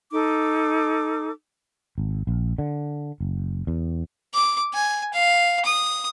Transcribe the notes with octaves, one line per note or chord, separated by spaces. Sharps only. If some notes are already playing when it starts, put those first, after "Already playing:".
D#4 A4 D6
G#1
A#1
D3
F#1
E2
D6
G#5
F5
D#6